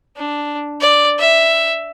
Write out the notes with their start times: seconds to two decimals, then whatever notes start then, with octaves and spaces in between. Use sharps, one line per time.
0.16 D4
0.81 D5
1.19 E5